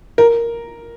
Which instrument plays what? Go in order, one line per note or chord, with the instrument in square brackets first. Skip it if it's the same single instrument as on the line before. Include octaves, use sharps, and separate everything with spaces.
[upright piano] A#4